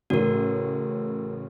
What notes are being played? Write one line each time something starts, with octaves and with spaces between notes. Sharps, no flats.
A1 A2 C#3 F#4 A#4